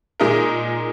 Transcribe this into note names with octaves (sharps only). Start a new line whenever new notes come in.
A#2 G#3 D#4 A#4